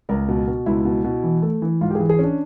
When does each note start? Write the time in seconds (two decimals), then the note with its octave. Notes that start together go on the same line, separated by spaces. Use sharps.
0.09 C#2 A#4
0.28 B2
0.47 B2
0.66 C#2 E4
0.85 B2
1.04 B2
1.24 E3
1.42 A3
1.62 E3
1.81 G#2 F4
1.91 G4
1.95 E3 G#4
2.09 G#4
2.19 C#4 D4